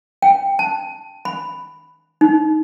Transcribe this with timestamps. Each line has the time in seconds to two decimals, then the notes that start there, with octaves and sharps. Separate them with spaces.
0.22 G5
0.59 A5
1.25 B5
2.21 D#4